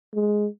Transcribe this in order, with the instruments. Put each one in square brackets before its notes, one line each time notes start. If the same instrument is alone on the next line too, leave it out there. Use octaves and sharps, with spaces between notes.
[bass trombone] G#3